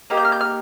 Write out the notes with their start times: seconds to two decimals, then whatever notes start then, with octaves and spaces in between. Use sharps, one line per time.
0.10 A#3 D#4 G4
0.17 G6
0.25 F6
0.32 G6
0.41 F6